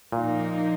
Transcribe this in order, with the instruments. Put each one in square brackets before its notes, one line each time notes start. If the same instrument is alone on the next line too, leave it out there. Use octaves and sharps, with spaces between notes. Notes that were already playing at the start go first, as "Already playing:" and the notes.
[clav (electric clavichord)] A#2 [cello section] F3 A#3 D#4